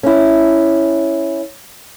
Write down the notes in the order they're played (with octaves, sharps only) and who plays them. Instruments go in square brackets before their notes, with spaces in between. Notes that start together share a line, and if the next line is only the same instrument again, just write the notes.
[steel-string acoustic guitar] C#4 E4